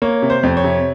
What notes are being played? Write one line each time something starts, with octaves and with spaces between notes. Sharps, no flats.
A#3 C#5
C3
C5
F2
C#5
C3